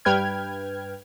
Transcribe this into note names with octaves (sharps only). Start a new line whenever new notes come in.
G2 B4 G5 F6 G#6